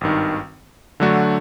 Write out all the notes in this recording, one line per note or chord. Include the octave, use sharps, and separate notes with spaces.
G#1 G2 D#3
D3 F#3 A3 D4 F#4